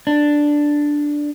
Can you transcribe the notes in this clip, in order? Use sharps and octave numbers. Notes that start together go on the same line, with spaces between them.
D4